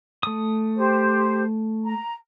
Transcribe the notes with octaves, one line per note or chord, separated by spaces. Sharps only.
A3 D#6
G4 C5
A#5